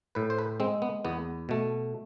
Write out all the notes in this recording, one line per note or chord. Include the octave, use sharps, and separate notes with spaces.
A2 B4
C5
B4
G#3 C4
B3
E2 B3
B2 A3